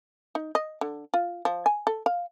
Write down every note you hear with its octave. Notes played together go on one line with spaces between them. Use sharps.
D#4
D#5
D3
F4
F3
G#5
A4
F5